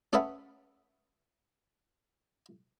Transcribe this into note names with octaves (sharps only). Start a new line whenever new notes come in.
C#4 G#4 A4 B4 E5 F#5